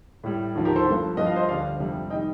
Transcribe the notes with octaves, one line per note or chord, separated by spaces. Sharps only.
A2 G3
D#2 D3 F3
G4 A#4
A4 C5
G2 F3
G2 F3 D#5
F5
C5 D#5
D2 D3 G3 D5 F5
F2 C3 G3
D#3 G3 D#5 G5